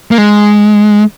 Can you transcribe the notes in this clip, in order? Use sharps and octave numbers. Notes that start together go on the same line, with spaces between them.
A#3
G#3